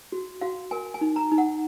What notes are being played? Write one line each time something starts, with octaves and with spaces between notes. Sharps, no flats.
F#4
F#4 F5
A#4 G#5
G#5
D#4
A#5
D#4
F#5